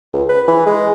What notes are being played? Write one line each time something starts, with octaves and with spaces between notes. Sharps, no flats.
C#2
B4
E3
G#3